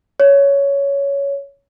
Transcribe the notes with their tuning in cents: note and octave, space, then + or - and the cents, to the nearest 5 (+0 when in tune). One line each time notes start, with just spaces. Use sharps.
C#5 +10